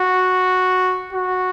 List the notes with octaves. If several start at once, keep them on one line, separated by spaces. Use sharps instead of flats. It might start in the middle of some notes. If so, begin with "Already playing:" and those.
Already playing: F#4
F#4